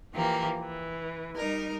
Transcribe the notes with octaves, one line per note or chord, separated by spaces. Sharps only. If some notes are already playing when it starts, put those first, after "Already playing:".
E3 F3 A#3 G4
E3
G3 D#4 A#4